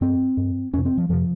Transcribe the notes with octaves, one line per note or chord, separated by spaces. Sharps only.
G2 C4
G2
F2 C3 C#4
C4
F3
F2 C3 F3